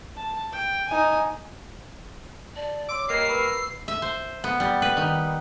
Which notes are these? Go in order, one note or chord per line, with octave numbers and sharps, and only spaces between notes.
A5
G5
D#4 G#5
D5 A5
C#5 C6 D6 E6
G3 A#3 D#5 C7
B4 B5 C#6 E6
E5
C5
B3
G3
B4
D#3